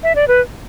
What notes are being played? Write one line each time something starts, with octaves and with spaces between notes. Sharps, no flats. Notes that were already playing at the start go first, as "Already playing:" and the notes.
E5
D5
B4